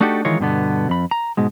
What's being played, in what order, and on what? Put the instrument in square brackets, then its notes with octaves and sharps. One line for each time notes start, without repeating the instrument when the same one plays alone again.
[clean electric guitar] A3 D4 D#4 F#4 G4 A4
D#3 E3 G#3 F4 A#4 C#5
G2 B2 D3 B3
F2 B5
A#5
G#2 B2 G#3